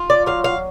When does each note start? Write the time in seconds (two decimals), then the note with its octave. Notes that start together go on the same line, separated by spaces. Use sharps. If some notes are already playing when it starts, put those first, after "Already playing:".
Already playing: F4
0.10 D5
0.26 F#3 F5
0.44 F5